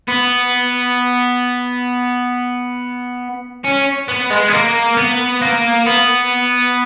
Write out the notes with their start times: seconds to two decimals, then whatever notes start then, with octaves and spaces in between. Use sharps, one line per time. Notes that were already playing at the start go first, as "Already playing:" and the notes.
0.08 B3
3.64 C#4
4.08 B3
4.31 G#3
4.49 B3
4.53 A#3
4.97 B3
5.42 A#3
5.86 B3